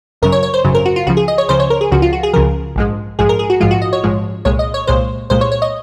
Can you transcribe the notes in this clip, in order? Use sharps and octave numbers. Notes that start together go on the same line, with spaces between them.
G#1 F#2 C#3 F#3 A#4
C#5
C#5
C5
G#1 F#2 C#3 F#3
A#4
F#4
F4
C#2 C#3 F3 F#4
G#4
D#5
C#5
C#2 C#3 F3 C5
C#5
A#4
G#4
C#2 C#3 F3 F#4
F4
F#4
G#4
C#2 C#3 F3 A#4
A#1 G#2 F3 G#3
A#1 G#2 F3 G#3 G#4
A#4
G#4
F#4
A#1 G#2 F3 G#3 F4
F#4
D#5
C#5
A#1 G#2 F3 G#3
C2 A#2 G#3 C#5
D#5
C#5
C2 A#2 G#3 C5
C2 A#2 G#3 C5
C#5
C#5
D#5